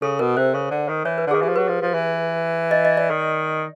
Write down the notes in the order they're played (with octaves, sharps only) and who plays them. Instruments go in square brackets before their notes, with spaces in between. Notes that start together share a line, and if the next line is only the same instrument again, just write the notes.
[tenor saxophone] C#3 [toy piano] A4
[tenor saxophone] B2 [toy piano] A#4
[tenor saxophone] C3 [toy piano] C5
[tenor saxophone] C#3
D3
D#3
[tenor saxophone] E3 [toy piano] C#5
[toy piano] B4
[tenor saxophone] D3
[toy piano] G#4
[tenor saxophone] D#3
[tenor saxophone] E3 [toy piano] G4
[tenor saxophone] F3
[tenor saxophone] F#3 [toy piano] B4
[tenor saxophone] F3
F3
E3
[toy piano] D#5
D#5
D5
[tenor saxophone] D#3